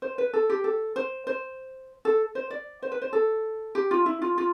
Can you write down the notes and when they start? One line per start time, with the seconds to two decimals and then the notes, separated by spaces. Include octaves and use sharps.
0.02 C5
0.18 B4
0.33 A4
0.50 G4
0.64 A4
0.96 C5
1.27 C5
2.05 A4
2.35 C5
2.50 D5
2.82 C5
2.92 B4
3.02 C5
3.13 A4
3.75 G4
3.91 F4
4.06 E4
4.22 F4
4.38 F4